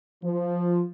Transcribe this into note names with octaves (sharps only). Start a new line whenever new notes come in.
F3